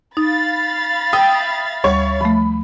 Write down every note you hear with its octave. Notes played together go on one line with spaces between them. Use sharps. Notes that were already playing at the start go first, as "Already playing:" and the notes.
D#4 F5 B5 A6
E5 G5 D#6
D2 G3 C#5 C#6
F3 A3 B5